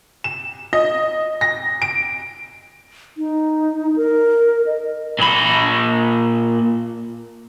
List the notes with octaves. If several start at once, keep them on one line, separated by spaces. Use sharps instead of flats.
E7
D#5
A#6
D7
D#4
A#4
D#5
A#2 B5